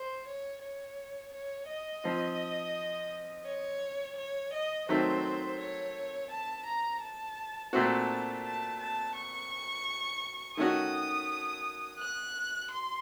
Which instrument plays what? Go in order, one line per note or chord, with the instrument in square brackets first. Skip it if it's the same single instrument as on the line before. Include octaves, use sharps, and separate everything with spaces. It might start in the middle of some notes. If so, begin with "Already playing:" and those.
Already playing: [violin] C5
C#5
C#5
C#5
D#5
[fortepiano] F3 C4 F4
[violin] C#5
C#5
D#5
[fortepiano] D#3 F#3 A3 C4 [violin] C5
[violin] C#5
A5
A#5
A5
[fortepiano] A#2 A3 C4 F#4 [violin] A5
[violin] A5
A5
C#6
[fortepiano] D#3 A3 C#4 F#4 [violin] D#6
[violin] F#6
C6